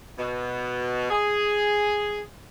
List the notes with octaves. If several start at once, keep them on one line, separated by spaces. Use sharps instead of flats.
B2
G#4